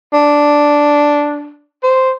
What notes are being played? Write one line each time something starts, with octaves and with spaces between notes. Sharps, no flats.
D4
C5